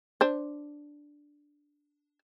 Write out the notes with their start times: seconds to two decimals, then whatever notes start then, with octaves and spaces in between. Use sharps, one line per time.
0.21 D4 C5